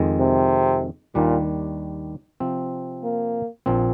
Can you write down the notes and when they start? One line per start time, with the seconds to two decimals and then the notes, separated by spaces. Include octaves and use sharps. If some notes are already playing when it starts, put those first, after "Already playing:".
Already playing: F2 D#3 G#3
0.20 C3
1.15 D#2 A#2 D#3 G3 D4
2.40 C3 F3 C4
3.03 A#3
3.66 A#1 A#2 F3 C4